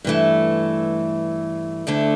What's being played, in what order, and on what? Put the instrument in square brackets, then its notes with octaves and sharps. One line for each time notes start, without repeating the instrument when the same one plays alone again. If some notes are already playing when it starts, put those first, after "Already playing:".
[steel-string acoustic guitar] G2 E3 A3
D2 D3 A3 D4